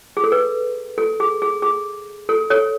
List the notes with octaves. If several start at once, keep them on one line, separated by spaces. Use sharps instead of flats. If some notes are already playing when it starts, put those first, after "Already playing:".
G#4
A4
B4
A4
G#4
G#4
G#4
A4
A4 C#5